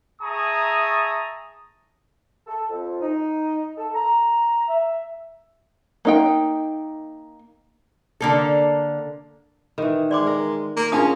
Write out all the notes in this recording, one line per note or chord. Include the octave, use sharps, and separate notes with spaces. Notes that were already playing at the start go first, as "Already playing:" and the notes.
G#4 E5 A5 A#5 C#6 D#6
A4
F2
D#4
A4
A#5
E5
A#3 D#4 G5
D3 A#3 A4
D#3 E3
G#3 D5 C6 D6
A#4
A#3
C#4 D4 F4 G#4 A#4 A5 D#6